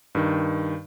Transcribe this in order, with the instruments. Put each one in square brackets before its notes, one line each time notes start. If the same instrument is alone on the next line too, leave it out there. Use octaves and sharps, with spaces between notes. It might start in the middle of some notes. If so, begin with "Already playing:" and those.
[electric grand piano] G2 D#3